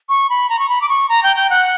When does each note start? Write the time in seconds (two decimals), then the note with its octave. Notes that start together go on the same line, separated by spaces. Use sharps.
0.09 C#6
0.30 B5
0.49 A#5
0.59 C#6
0.69 B5
0.82 D6
0.89 C#6
1.09 A#5
1.23 G5
1.36 G5
1.50 F#5